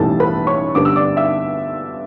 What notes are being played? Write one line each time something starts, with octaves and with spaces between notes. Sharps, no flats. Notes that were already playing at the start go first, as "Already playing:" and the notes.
Already playing: B1 A2 E3 G3 A4 A5
B4 B5
C#5 C#6
G2 D3 G3 B3 D6
E6
D5 D6
E5 E6